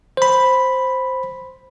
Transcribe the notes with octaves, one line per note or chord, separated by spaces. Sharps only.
C5 B5